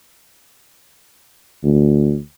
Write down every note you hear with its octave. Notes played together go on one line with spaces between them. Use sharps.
D2